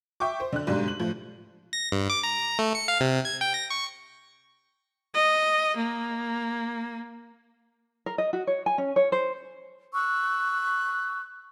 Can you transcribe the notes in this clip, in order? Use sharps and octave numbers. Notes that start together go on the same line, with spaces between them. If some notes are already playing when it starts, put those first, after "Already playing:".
E5 G5 C#6 D6
C5
D3 D4 F#6
B1 G#2 D3 G3
F#7
A2 F3
A#6
G2
D6
A#5
A3
C#7
F5
C3
G#6
G5
A#6
C#6
D#5
A#3
A#4
D#5
F#4
C#5
G#5
C#4
C#5
C5
C#6 E6 F#6